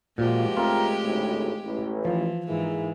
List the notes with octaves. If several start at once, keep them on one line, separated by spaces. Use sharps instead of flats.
A#2 F3 G#3 A#3 F#4 G4
C#2 A#2 A3 C4 F4 A#4
G#1 D2 A2
A1
E3 F3
G#2 E3 A#3 E4 G#4